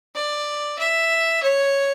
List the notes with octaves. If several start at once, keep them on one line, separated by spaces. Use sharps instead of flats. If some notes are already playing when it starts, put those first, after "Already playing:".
D5
E5
C#5